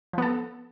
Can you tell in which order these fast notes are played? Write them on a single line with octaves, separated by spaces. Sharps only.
F3 B3 A4